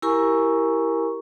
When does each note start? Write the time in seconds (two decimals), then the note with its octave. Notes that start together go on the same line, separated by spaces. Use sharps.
0.02 E4 G4 A#4 G#5 A#5 C#6